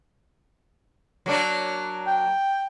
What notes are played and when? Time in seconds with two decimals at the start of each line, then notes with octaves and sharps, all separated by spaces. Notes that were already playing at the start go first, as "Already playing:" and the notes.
1.26 F#3 A#3 D4
2.07 G5